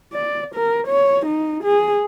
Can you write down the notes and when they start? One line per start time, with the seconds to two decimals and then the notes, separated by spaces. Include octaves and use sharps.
0.13 D5
0.55 A#4
0.87 C#5
1.26 D#4
1.64 G#4